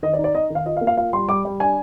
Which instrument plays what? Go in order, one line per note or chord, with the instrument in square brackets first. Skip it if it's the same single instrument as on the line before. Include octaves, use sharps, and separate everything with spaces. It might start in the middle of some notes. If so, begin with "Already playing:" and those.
[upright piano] D#3 D#5
D5
D#4
D5
D#4 D#5
D#3
F5
F4 D#5
F5
A#3
F5
F4 F5
G3 C6
G3 D6
G3
D4 G#5